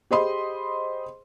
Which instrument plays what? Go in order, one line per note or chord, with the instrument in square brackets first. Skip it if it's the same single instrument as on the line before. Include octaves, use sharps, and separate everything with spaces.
[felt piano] G4 G#4 C5 D#5 B5 C6